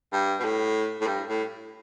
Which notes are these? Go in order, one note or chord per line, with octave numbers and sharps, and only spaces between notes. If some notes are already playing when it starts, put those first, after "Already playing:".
G2
B2
A2
A2
G2
A2